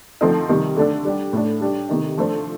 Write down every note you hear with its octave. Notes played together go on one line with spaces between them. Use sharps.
D3 F3 A3 C4 D#4
C3 D#3 G3
D3 A3 D4 A4
G3 D4 G4
A2 A3 D4
G3 D4 G4
C3 D#3 A3 D#4
F3 A3 D4 A4 C5